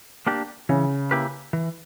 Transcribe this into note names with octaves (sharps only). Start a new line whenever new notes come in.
A#3 D4 G4
C#3 E3
A#3 E4 G4 B4
E3